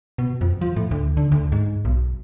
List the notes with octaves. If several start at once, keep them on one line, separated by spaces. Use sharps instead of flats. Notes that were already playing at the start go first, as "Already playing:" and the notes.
B2
F2
F3
A2
D2
D3
D2
G#2
B1